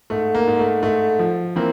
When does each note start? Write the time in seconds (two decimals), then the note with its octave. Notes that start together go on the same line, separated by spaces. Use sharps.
0.10 G#2 A3
0.35 A#3
0.47 G#2
0.59 A3
0.83 G#2 A3
1.19 F3
1.56 E3 A#3 C4